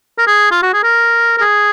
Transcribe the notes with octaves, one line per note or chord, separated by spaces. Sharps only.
A#4
G#4
F4
F#4
G#4
A#4
A#4
G#4